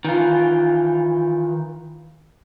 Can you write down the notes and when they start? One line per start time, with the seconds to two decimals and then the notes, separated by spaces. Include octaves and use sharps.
0.05 D#3 E3 F4